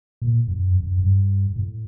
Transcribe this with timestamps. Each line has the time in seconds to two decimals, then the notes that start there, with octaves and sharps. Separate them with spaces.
0.22 A#2
0.48 F#2
0.80 F#2
1.00 G2
1.56 A2